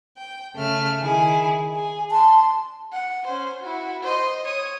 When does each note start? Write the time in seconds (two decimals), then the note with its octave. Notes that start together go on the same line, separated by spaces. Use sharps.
0.18 G5
0.54 C#3 A3 F6
0.99 D#3 E4 G#4
1.73 G#4
2.12 A5 C6
2.92 F#5
3.26 C#4 C5
3.61 E4 F#4
4.03 C5 D#5
4.45 C#5 D#6